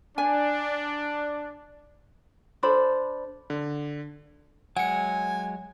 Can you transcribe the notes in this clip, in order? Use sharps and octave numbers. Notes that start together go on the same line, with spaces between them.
D4 G#5
D4 A4 C5 B5
D3
F#3 G#3 F#5 G#5 C#7